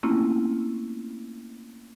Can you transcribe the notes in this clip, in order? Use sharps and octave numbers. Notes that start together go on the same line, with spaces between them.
A3 A#3 C4 C#4 E4 F4